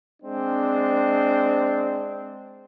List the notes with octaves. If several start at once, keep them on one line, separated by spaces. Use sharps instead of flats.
G#3 C4 D4